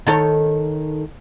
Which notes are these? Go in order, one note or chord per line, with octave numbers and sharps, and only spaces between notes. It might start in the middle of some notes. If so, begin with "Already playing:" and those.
D#3 A4 C#5